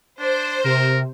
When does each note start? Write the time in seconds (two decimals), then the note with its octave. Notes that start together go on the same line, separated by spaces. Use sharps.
0.20 D4 C5
0.64 C3 A#4